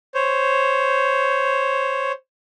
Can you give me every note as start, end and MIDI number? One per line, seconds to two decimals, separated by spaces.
0.15 2.12 72
0.15 2.12 73